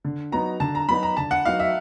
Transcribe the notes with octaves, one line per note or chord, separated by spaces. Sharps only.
D3
F#3 B3 D#4 F#4 A#5
D3 A5
A#5
F#3 B3 D#4 F#4 B5
A#5
D3 A5
F#5
F#3 B3 D#4 F#4 F5
E5